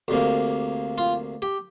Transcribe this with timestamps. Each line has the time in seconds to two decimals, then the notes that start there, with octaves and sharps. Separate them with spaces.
0.08 D2 C3 A#3
0.98 F4
1.42 G4